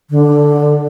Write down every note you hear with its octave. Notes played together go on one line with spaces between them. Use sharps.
D3